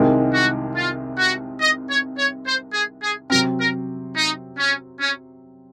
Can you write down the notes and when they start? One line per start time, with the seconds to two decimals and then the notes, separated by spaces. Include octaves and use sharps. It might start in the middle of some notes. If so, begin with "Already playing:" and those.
Already playing: C2 C3 D#3 G#3 C4
0.33 F#4
0.75 F4
1.18 F#4
1.60 D#5
1.89 C#5
2.17 C#5
2.46 C5
2.73 G#4
3.02 G#4
3.30 C3 F#3 C4 A#4
3.59 A#4
4.16 D#4
4.57 C#4
5.00 C#4